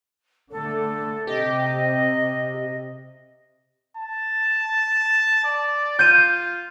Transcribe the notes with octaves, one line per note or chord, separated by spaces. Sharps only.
D3 A3 A4
C3 G4 D#5
A5
D5
F4 G6 D#7